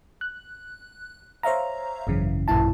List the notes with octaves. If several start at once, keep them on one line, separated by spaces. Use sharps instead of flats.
F#6
C5 C#5 E5 F5 A#5
G#1 F#2 C#3 E3
A1 F#2 A#2 E4 A5